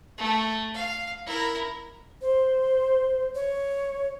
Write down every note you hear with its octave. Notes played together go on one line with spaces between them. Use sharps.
A3
F5
E4 A#4
C5
C#5